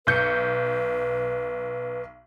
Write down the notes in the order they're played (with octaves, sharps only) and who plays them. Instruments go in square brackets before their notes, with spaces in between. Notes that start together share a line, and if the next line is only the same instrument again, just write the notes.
[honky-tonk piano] B1 G6 C#7 [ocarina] B4